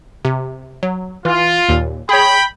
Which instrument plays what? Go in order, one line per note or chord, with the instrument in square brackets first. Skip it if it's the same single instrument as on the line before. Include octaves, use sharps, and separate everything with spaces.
[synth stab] C3
F#3
[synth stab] E3 [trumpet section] F4
[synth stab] D#2 A#2
[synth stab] G#4 C#5 [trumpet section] G5 B5